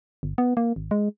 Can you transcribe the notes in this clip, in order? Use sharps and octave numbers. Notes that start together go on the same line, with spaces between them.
G1
B3
A#3
G#1
G#3